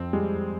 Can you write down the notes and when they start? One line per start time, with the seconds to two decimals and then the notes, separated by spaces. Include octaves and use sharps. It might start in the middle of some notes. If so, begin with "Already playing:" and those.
Already playing: F2 C4
0.13 G3 G#3